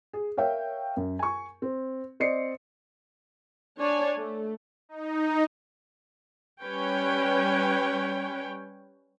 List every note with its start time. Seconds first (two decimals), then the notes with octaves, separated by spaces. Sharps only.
0.13 G#4
0.37 A#4 C#5 E5 F5 G5
0.97 F#2
1.19 G#5 C#6
1.62 C4
2.20 C4 D5 D#5 C7 C#7
3.79 D4 C#5 D5 G#5
4.17 A3
4.89 D#4
6.63 G3 C#4 B4 C#5 G5